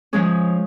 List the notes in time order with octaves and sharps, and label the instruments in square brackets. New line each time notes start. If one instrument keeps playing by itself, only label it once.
[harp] F3 G#3 C#4 G#4